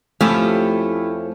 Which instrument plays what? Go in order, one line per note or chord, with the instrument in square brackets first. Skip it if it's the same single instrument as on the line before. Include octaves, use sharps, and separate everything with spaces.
[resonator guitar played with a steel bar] F2 F3 C#4 [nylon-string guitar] A3 [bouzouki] E4 G4 A4